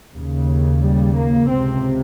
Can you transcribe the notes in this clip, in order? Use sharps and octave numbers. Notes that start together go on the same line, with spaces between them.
D#2 C#3
G3
A#3
C#2 C3 C4